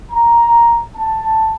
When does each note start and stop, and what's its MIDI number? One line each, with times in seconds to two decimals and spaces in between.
0.10 0.81 82
0.96 1.54 81